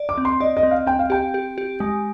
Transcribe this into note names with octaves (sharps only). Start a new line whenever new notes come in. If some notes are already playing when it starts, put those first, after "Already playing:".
Already playing: D5
D6
C4
C6
D5 D#5
D#5
C4
F5
C4 G5
F5
G4 G5
G4
G4
G#3 G#5